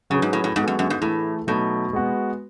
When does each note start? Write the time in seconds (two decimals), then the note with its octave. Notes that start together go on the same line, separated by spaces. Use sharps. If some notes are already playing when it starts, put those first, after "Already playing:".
0.10 C#3 F#3 C#4 G#4 B4
0.22 G#2
0.33 A2
0.44 A2
0.56 G#2 G#3 B3 F#4 A4
0.68 F#2
0.79 F#2
0.90 G#2
1.01 A2 E3 A3 E4 G#4
1.47 B2 F#3 A3 D#4
1.93 G#3 B3 F#4